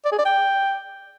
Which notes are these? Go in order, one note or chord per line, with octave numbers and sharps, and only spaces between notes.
D5
G#4
D5
G5